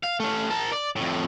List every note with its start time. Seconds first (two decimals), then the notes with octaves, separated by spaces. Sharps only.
0.04 F5
0.20 A3 C#4
0.50 A#4 A5
0.72 D5
0.96 F2 A2